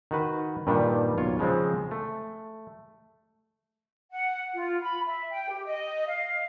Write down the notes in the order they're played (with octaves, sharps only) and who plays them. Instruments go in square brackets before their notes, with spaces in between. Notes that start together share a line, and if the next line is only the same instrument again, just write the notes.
[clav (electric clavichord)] D#3 F#4 B4
G2 A#2 D#3 G3 D4
B1 F4 C#5
C#3 F3 G#3 C4
A3
[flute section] F#5
F4
B5
E5
G5
G4
D#5
F5